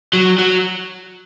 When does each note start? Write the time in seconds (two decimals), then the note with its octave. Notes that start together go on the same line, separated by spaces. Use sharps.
0.13 F#3
0.38 F#3